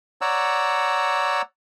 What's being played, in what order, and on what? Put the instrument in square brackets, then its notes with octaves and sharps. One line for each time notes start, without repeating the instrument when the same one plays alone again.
[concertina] C#5 D5 F#5 A#5 E6